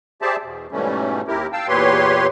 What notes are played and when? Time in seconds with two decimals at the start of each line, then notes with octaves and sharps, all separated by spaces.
0.22 G4 G#4 C5 D5 E5 A5
0.44 E2 B2
0.72 G#2 B2 E3 G3 A3 C#4
1.28 D#2 E4 G4 A#4
1.53 F5 G5 A5 E6
1.68 E2 A#2 G4 B4 C#5 C6